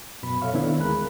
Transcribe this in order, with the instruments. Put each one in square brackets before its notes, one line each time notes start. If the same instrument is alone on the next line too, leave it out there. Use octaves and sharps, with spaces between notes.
[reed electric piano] F#2 B2 B5
A4 C#5 E5 F5 C#6
D#3 B3 C4 D4 E4
D2 G#3 G#4 A#4 B5 F#6